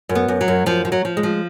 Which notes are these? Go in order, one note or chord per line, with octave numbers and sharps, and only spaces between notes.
F#2
B3
F#2
F#3
F#2
F#2 F3
F3
F#3
F3
G#3
F3